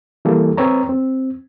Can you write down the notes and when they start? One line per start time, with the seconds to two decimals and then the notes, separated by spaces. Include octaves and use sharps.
0.25 E3 G3 A#3 A4
0.57 C4 B4 C#5 A#5
0.89 C4